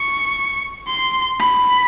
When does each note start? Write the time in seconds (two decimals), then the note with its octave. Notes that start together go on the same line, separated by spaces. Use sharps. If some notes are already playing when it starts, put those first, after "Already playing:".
Already playing: C#6
0.88 C6
1.40 B5